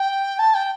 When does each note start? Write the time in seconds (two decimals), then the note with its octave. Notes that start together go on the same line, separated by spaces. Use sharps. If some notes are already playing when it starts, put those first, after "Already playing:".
Already playing: G5
0.39 A5
0.54 G5